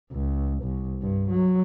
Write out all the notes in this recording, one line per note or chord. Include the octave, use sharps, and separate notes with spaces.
C#2
C2
G2
F#3